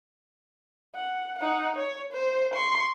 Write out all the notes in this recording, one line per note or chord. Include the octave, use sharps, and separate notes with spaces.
F#5
D#4 F#5
C#5
C5
C6 C#6